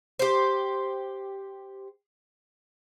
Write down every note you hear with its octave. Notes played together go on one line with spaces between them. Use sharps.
G4 C5